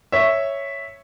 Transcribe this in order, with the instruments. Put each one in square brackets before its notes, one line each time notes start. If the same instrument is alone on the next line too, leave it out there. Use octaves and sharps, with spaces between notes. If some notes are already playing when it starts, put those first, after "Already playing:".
[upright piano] C#5 E5